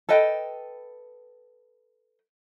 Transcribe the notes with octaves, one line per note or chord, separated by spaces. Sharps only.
A4 B4 D#5 G5